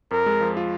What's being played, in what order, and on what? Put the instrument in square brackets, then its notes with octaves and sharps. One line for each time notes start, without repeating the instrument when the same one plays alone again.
[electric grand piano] F2 [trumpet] A#4
[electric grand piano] G#3
F3
F4